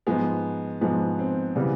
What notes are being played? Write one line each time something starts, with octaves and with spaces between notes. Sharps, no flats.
G#2 F3 G#3 B3
G#2 F3 G#3 B3
C4
C#3 E3 G3 B3